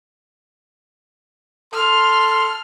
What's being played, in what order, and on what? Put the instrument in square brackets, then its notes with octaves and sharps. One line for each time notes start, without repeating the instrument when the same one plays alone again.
[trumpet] A4 [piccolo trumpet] C6 [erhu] F6